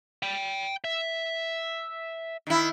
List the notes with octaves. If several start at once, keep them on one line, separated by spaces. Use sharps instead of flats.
G5 B5
E5
D#3 E4